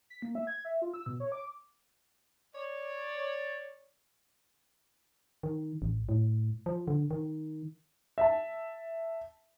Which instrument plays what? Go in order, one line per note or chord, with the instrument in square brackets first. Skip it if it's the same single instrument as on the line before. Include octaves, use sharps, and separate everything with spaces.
[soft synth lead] B6
A#3
E5
G#6
E5
F4
E6
B2
C#5
D6
[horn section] C#5 D5
[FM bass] D#3
A1
A2
F3
D3
D#3
[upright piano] E5 A5